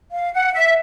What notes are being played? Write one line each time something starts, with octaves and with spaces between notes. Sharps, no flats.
F5
F#5
E5